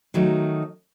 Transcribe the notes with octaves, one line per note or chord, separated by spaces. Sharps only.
D#3 F#3 A3 D#4